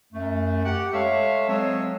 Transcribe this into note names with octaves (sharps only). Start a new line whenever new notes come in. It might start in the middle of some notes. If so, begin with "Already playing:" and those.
F#2 A3
G4 F#5
G#3 A4 C#5 E5 F5
F#3 G#3 C4 C#5 D#5 E6